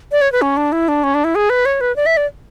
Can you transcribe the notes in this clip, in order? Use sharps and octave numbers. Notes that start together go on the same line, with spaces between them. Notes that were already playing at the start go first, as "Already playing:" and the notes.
D5
C#5
B4
C#4
D4
E4
D4
C#4
D4
E4
G#4
B4
C#5
B4
D5
E5
D5